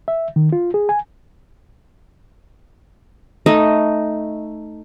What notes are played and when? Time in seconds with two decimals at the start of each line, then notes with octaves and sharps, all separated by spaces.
0.08 E5
0.36 D#3
0.53 F4
0.74 G#4
0.89 G#5
3.46 A3 D#4 D#5